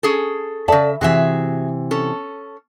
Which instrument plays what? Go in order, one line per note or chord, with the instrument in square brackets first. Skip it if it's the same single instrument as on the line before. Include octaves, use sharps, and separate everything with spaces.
[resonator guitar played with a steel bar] C#4 G#4 A4
[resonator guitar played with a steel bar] C#3 E5 [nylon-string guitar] A4 D5 A5
[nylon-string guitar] C3 E3 [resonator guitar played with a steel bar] F#4 G#4 E5
[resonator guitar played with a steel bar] C#4 A4